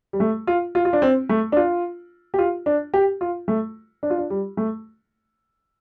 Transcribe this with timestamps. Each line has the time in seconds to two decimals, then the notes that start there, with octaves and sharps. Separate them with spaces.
0.13 G3
0.20 A3
0.47 F4
0.75 F4
0.85 F4
0.93 D4
1.02 C4
1.29 A3
1.52 D4
1.57 F4
2.34 G4
2.39 F4
2.66 D4
2.94 G4
3.21 F4
3.48 A3
4.03 D4
4.10 F4
4.18 D4
4.30 G3
4.57 A3